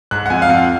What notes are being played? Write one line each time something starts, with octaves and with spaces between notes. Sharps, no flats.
G#2 F#6
F#5
F2 G#5
F5
F2 F#5